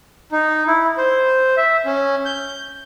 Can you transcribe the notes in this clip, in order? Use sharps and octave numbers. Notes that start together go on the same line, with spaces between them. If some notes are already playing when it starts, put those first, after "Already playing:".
D#4
E4
C5
E5
C#4
G6